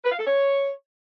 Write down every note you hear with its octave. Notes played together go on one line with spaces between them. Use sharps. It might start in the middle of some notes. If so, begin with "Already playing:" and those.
B4
F5
A4
C#5